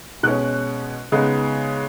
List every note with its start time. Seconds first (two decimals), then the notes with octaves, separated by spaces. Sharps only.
0.23 B2 G#3 C#4 F#6
1.12 C#3 G#3 B3 D#4